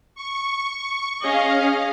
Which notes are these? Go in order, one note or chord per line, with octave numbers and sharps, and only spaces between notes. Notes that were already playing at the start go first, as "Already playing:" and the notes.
C#6
C#4 G#4 D#5 F5